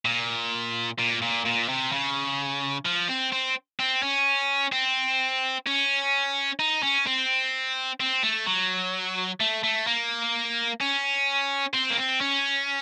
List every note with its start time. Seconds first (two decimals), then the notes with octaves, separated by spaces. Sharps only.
0.05 A#2
0.99 A#2
1.22 A#2
1.45 A#2
1.69 C3
1.92 C#3
2.86 F3
3.09 C4
3.33 C4
3.80 C4
4.03 C#4
4.72 C4
5.66 C#4
6.59 D#4
6.83 C#4
7.07 C4
8.00 C4
8.23 A3
8.46 F#3
9.40 A3
9.63 A3
9.87 A#3
10.80 C#4
11.74 C4
11.90 A#3
11.97 C4
12.21 C#4